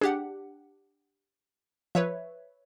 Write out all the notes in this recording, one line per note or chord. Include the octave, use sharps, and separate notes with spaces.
D4 G4 G#4 F#5
F3 B4 C#5 E5